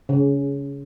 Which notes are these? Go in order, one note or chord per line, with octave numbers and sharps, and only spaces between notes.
C#3